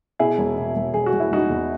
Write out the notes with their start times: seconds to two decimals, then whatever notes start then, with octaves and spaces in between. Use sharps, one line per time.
0.19 B2 E4 G#4
0.38 E1
0.56 B2
0.76 E1
0.93 E1 G#4
1.06 F#4
1.12 E1
1.20 E4
1.31 E1 D#4 F#4
1.49 E2